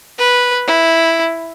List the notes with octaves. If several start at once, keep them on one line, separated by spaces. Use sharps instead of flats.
B4
E4